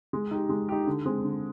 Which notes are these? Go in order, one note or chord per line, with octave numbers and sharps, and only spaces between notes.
G#3
D#4 G4
G#3
D#4 G4
D3
G#3 C4
D3